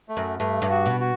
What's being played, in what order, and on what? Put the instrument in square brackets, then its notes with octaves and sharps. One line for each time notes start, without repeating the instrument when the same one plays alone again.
[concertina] A3
[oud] F#2
[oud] G2 [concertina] A3
[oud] G2
[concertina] F#4
[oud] B2
[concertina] F#4